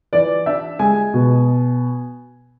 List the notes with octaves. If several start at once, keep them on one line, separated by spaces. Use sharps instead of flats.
E3 D5
D4 E5
G#3 G#5
B2